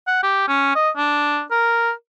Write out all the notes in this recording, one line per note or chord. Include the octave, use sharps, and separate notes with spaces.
F#5
G4
C#4
D#5
D4
A#4